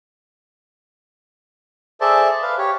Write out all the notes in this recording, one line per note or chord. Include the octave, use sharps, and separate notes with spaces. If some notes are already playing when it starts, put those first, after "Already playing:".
G#4 A4 C5 D5 E5 A5
B4 F5
G4 C#5